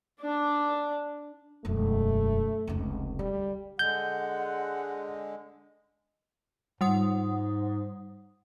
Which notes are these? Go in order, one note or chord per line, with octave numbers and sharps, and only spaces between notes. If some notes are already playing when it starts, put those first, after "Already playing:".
D4 D5
E1 F#2 A3
F1 C#2
D3 G3
D3 G#3 F#5 G6
G#2 G3 F#5 D#6